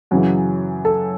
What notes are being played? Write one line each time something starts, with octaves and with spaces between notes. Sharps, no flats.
F#2 C#3 E3 F#4
A4